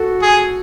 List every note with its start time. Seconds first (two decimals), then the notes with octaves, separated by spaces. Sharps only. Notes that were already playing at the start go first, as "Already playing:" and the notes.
Already playing: F#4 A4
0.22 G#4